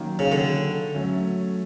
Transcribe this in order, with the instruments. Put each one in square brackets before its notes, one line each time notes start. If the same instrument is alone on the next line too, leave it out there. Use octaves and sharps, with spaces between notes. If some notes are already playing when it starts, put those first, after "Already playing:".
Already playing: [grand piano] D#3 F#3 A#3 C#4
[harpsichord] C#3
D3
[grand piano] F#3 A3 C#4